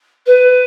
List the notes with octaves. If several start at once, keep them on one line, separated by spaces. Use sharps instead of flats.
B4